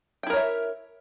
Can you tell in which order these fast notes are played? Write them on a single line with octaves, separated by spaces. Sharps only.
G5 E4 A#4 C#5 E5